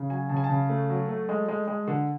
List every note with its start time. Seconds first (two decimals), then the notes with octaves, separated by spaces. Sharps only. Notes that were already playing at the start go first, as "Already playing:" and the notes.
Already playing: C#3
0.10 F#3 G#5
0.29 C#3 A5
0.37 G#5
0.44 A5
0.49 C#3
0.69 A3
0.90 F#3
1.09 A3
1.29 G#3
1.48 G#3
1.68 G#3
1.88 D3